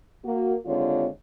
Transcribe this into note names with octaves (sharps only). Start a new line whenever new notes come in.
A#3 F#4
D#2 D3 G#3 C4 F4 C#5